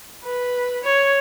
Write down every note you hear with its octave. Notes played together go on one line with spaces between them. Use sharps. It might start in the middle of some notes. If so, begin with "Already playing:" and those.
B4
C#5